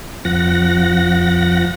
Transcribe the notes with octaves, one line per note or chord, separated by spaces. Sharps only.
F2 F3 F#5 A#6